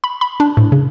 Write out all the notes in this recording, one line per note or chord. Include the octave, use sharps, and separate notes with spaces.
B5
B5
D4
A2
C#3